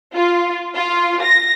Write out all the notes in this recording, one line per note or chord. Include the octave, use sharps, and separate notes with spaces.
F4
F4
A#6